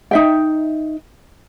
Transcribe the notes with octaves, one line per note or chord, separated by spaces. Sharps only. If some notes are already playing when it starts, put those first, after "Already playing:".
D#4 E5 G5